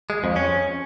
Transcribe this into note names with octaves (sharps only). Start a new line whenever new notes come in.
G#3
F2
C#4